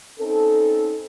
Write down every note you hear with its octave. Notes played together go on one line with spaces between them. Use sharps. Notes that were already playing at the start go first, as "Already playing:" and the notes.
C4 C#4 D#4 A4